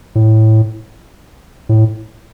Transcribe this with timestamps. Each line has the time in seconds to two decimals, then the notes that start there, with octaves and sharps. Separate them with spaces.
0.15 A2
1.69 A2